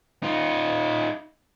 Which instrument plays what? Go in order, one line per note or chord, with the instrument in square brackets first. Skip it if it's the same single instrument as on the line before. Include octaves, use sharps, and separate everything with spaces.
[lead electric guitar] D#4 F4